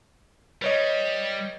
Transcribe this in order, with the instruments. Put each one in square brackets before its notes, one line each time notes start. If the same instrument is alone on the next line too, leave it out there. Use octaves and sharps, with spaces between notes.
[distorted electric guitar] G3 [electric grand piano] B4 C#5 D#5